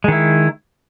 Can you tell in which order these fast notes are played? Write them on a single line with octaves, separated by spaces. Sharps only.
G#3 D#3 E4